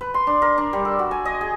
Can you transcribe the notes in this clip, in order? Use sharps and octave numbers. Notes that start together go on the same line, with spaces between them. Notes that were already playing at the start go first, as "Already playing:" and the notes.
B4
C6
D4
A#4
D4
G3
A4
F#4
G#5
D#5
G#4